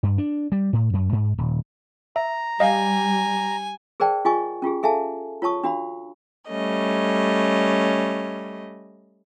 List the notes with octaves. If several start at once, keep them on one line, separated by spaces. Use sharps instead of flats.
G2
D4
G3
A2
F#2
G#2
D#1
E5 A#5
G3 D#5 F5 G#5
G#4 A#4 C5 D5 G5 A5
F4 G#4 D#5 G#5 C#6
C#4 F4 G4 G#4
G#4 A4 E5 F5 G#5 A5
F4 C#5 A5 C#6 D#6
D4 F#4 F5 B5
G3 A3 C#4 D#5